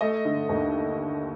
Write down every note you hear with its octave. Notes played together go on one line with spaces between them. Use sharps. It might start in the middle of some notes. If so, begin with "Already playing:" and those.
A3 D#5
D3
D#2